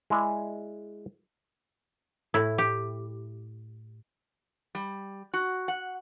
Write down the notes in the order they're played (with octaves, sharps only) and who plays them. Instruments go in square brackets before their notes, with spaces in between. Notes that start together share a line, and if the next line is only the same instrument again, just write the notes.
[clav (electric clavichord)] G#3 E4 G#4 D5
[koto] A2 E4
G4
[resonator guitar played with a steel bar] G3
F#4
F#5